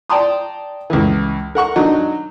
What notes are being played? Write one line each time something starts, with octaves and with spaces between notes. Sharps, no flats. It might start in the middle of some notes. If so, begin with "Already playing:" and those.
D5 G5 A5 A#5 C6 D#6
C#2 E3
A#4 F#5 C#6
F#3 D4 D#4 D#5